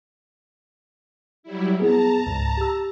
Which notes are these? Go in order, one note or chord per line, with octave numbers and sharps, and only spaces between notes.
F#3 G3 E4
B3 G#4 A5 A#5
C#2 G#2
G4 E6